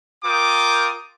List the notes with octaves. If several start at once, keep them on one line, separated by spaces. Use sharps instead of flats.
F4 A#4 G5 D6 D#6